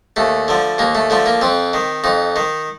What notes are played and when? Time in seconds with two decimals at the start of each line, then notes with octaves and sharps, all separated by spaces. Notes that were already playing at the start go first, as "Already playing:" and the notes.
0.16 D#2 A3
0.48 D3 F3
0.78 D#2 A#3
0.95 A3
1.10 D3 F3 A3
1.26 A#3
1.41 F2 C4
1.73 D#3
2.04 F2 D#4
2.36 D#3